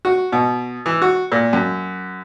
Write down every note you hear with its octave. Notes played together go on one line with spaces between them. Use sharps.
F#4
B2
E3
F#4
A#2
F#2